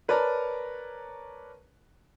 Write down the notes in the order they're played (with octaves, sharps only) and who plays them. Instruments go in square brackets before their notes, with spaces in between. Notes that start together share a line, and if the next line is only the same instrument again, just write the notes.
[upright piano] A#4 B4 C#5 D5 A5 A#5